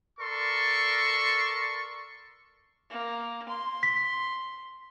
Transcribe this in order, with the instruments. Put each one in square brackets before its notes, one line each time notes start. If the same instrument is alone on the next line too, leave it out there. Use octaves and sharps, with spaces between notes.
[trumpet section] A4 A#4 D5 C6 C#6
[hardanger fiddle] A#3
C6
[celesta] B6